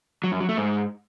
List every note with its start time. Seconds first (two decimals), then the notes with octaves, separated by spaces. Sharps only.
0.24 F#3
0.32 F#2
0.40 F#3
0.49 A3
0.57 G#2